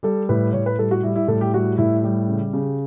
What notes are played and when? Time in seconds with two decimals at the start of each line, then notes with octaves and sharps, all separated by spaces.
0.03 G3 A4
0.29 A2 B4
0.53 A2 C#5
0.66 B4
0.78 G3 A4
0.91 F#4
1.03 G3 E4
1.15 E4
1.28 A2 A4
1.41 G4
1.53 G3 F#4
1.78 A2 E4
2.03 G3 G4
2.28 C#3
2.53 C#3